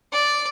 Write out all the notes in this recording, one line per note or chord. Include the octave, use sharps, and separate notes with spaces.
D5